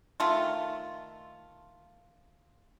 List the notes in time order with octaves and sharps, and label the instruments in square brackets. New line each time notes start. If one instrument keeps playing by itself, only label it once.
[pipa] D#3 A3 F4